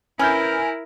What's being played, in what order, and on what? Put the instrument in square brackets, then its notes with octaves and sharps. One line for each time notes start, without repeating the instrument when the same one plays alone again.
[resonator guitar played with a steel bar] C#4 B4 [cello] E4 A#4 [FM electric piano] G#5 F6 G6